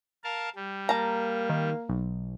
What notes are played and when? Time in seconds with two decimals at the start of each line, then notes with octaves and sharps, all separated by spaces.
0.24 A#4 F5 A5
0.56 G3
0.89 A#3 A5 A#5
1.49 D#3
1.89 B1